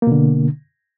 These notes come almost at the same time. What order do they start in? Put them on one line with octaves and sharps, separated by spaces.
A#3 B2 D3